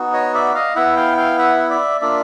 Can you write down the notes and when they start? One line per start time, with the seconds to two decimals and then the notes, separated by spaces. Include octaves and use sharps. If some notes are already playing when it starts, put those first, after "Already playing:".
Already playing: B3 D#4 F#4
0.13 C#5 D#5
0.34 D5 E5
0.54 D#5 F5
0.75 B3 E4 E5 F#5
0.96 F5 G5
1.18 F5 G5
1.39 E5 F#5
1.70 D5 E5
2.01 A#3 D4 F4 D5 E5